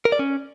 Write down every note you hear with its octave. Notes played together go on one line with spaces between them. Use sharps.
A#4
D5
C#4